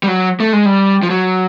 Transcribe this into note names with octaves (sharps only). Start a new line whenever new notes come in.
G3
F#3
A3
G#3
G3
F3
F#3